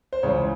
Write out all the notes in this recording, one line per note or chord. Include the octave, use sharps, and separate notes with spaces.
C5
C#2 C#3 E3 C#5